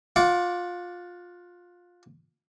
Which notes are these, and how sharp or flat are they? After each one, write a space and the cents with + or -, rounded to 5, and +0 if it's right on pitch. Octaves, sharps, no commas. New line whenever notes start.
F4 +20 F#5 +0 D6 -30